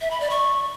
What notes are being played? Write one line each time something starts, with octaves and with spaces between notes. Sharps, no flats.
E5
B5
D5
C#6